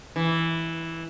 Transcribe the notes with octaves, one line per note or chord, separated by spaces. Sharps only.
E3